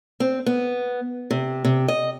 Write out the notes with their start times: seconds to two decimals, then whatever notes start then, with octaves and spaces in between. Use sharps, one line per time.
0.20 C4
0.46 B3
1.31 C3
1.65 C3
1.88 D#5